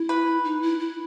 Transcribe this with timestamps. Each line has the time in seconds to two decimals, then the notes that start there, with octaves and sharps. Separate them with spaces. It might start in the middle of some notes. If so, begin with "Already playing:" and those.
Already playing: E4
0.09 B4
0.45 D#4
0.62 E4
0.80 E4